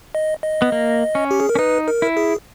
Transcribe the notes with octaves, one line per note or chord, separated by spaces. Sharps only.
D#5
D#5
B3
A#3
C#4
G4
G#4
A#4
C#4
D#4 B4
A#4
E4
G#4